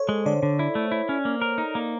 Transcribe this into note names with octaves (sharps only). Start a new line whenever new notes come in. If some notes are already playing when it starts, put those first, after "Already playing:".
Already playing: A4 C5 C#5
G#3
D3 D5
D3
E4
A3
E4
C#4
A#3
A#4
D#4
A#3